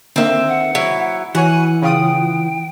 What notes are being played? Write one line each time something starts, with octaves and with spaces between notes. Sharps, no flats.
D3 D#3 A#3 C4 E5
F#5
F#3 E4
E3 F#4 C#5 F#5 G#5
C#3 F4 G5 D#6